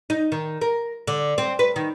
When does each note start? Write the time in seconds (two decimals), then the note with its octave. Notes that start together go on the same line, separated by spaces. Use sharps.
0.10 D#4
0.32 D#3
0.61 A#4
1.07 D3
1.38 C4
1.59 B4
1.76 D#3